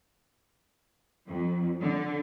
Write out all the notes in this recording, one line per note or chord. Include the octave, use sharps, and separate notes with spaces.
F2
D3